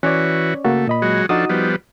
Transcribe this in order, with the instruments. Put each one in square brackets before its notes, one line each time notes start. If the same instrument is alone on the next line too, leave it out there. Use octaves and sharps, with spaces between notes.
[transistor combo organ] E3 F#4 [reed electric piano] C#4 C#5 D5
[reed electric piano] C#3 A#3 F#4 [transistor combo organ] A3
[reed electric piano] A#2 D#5 B5
[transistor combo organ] F#3 G#3 F#4
[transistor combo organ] F3 D4 A4 [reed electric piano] D#4 F#4 D#6
[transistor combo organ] F3 G3 B3